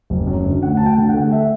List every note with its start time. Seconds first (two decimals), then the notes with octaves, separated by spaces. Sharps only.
0.10 F#1
0.27 F#2
0.45 D3
0.63 D2 F#5
0.77 D2 A5
0.86 G5
0.98 D3
1.09 F#5
1.14 A3
1.32 E5